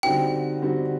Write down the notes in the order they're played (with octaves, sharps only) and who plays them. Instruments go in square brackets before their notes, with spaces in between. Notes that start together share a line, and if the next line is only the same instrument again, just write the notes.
[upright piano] D3 G3 C4 D#4 F#4 [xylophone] G5
[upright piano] D3 G3 C4 D#4 F#4